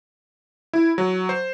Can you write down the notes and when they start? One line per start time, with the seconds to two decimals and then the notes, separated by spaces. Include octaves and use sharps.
0.73 E4
0.98 F#3
1.29 C5